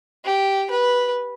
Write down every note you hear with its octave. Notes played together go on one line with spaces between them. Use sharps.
G4
B4